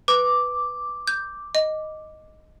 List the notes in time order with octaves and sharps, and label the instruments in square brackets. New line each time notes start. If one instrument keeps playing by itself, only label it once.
[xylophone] B4 [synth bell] D6
[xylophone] G6
D#5